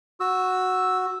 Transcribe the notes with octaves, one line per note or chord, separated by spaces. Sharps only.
F#4 E6